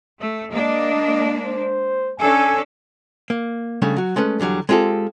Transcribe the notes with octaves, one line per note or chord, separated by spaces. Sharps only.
A3
G#3 A#3 D4 D#5
C5
C#4 D4 A4 G#5
A#3
C#3 G3 A3 D4
F#3 F#4
G#3 A3 C#4 B4
E2 D3 F#3 G3
G#3 C4 F4 G4 A4